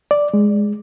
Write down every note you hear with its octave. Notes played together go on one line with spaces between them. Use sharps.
D5
G#3